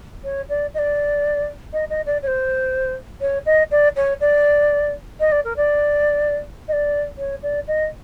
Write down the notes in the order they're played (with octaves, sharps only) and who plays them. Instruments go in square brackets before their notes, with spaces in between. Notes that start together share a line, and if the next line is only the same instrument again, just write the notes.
[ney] C#5
D5
D#5
D5
D#5
D#5
D5
C#5
C5
C#5
D#5
D5
C#5
D5
D#5
D5
A#4
D5
D#5
D5
C#5
D5
D#5